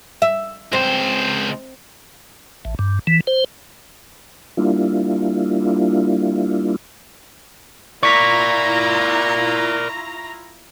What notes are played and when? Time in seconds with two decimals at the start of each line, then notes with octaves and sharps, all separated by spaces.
0.22 E5
0.73 C#2 C4 C5
2.65 A1
2.79 G2
3.07 E3
3.27 C5
4.57 G3 A#3 D4 E4 F4
8.03 E4 F4 A#4 D5 A#5 C#6 B6